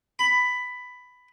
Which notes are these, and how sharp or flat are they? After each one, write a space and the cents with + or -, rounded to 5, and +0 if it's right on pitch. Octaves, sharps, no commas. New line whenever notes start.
B5 +10